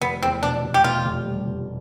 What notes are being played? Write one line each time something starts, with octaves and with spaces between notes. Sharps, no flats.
F1 B3
E2 C4
B2 D4
F1
G4
B2 F4
F1
G3
F1